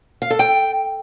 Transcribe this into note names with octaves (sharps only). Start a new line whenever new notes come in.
F5
A4
G5